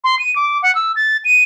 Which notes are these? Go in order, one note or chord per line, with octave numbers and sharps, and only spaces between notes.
C6
D#7
D6
F#5
E6
A6
D#7